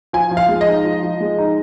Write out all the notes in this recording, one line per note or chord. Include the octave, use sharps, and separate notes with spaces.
F3 G#5
F3
F5
G#3
D#5
D#4
F3
F3
G#3
D#4